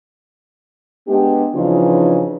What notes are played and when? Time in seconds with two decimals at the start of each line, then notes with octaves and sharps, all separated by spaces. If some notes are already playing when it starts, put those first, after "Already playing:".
1.08 G#3 B3 D4 G4
1.54 C#3 E3 F3 D4 D#4 F4